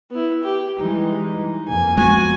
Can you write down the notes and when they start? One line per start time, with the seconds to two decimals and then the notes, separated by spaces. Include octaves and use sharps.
0.11 B3 E4
0.43 G4
0.79 E3 G3 G#3 D#4
1.68 F2 A#3 G#5
1.98 G#3 B3 F#4 G#5